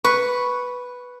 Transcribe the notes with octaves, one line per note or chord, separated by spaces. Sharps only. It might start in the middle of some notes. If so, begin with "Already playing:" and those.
B4 C#6